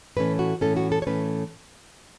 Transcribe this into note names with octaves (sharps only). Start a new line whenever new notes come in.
A2 E3 A3 C#4 B4
F#4
A2 E3 A3 C#4 A4
F#4
A4
C#5
A2 E3 A3 C#4 B4